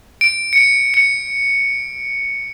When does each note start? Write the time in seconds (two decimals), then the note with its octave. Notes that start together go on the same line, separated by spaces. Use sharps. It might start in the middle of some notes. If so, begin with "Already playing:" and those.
0.21 D7
0.53 C#7
0.58 D7
0.94 C#7